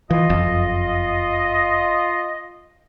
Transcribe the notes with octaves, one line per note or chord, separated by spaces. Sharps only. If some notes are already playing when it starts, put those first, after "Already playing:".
E3 F4 D#5
F#1 F2